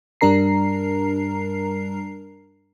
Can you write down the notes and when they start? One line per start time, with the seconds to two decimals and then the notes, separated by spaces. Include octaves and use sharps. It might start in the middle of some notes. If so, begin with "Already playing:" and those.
0.21 G2 G3 D4 A#4 A#5 C7